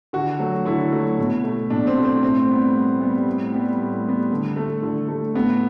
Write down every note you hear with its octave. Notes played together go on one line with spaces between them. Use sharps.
D3 F#4
F#3 A3
D3 E4
F#3 A3
B2
A3
B2 D4
C4
A3
C4
A2 C4
G3 B3
A2
G3 B3
A2
G3 B3
A2
G3 B3
D3
A3
D3
A3
A2 B3